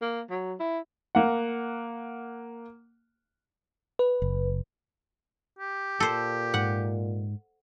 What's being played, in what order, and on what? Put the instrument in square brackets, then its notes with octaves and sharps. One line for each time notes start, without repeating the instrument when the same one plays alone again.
[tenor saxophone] A#3
F#3
E4
[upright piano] A#3 F#5
[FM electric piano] B4
[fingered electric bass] F#1
[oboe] G4
[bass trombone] A#2 [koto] A4 C5
[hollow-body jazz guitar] G#2 [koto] F#5